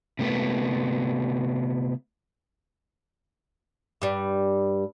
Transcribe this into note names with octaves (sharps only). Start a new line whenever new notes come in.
C3 A3 B3
G2 G3